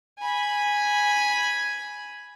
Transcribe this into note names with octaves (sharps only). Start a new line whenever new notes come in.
G#5 B5